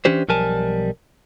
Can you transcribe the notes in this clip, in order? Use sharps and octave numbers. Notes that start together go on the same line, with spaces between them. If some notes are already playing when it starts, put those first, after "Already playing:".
E3 C#4 D4 G4 C5
B1 F3 G3 A#4 G#5 A5